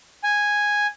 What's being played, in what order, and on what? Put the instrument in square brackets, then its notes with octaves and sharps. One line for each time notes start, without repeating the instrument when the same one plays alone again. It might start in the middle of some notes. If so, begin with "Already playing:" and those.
[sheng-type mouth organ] G#5